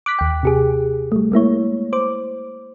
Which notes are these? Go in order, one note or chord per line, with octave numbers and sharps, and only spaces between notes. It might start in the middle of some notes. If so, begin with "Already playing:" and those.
D6 F#6 B6
D#2 G5
C3 G4 G#4
G3 A3
G#3 A#3 E4 C#5
C5 D6